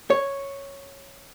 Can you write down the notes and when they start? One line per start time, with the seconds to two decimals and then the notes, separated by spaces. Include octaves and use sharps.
0.10 C#5